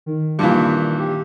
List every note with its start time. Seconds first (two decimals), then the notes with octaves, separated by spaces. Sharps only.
0.06 D#3
0.39 G2 A#2 E3
1.00 G4